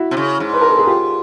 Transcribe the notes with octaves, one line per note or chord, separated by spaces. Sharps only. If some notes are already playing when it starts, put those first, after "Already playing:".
Already playing: E4 F#4
C3
C#3
G#2
B4
A#4
A4
G#4
F4 G4